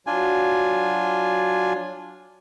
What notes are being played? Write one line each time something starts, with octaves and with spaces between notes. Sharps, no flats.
F#3 D4 F4 G#5